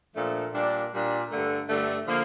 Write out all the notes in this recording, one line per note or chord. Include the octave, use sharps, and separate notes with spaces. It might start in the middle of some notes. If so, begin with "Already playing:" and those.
A#2 F3 A3 D4 A4
A#2 G3 D4
A#2 G3 D4
G2 D3 A3
G2 D3 A3
D3 F3 A#3